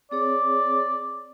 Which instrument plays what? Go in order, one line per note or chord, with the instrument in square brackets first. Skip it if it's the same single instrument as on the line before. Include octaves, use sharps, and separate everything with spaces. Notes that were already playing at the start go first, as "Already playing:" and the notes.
[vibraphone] C4 G#4 C#5 [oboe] D5